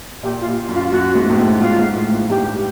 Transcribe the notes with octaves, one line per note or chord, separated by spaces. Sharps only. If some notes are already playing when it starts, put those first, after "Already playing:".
A#2 G4
F4
A#2
F#2
F4
F#2 F#4
G#2
A2
G#2
G#2 F4
G#2
A2
G#2
G2 G4